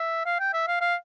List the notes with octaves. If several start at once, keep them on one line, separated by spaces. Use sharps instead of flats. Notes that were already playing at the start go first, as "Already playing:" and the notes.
Already playing: E5
F5
G5
E5
F5
F5